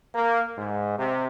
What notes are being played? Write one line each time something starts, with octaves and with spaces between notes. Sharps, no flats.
A#3
G#2
C3